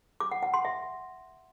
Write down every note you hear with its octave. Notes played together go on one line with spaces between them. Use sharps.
D6
F#5
F#5
C6
E5